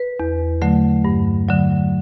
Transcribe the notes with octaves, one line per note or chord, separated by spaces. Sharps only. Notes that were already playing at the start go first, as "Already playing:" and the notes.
Already playing: B4
E2
D3 F#3 A3
G2
D3 F#3